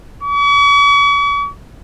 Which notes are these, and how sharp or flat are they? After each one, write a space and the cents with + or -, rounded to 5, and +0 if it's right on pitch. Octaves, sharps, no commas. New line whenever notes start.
C#6 +45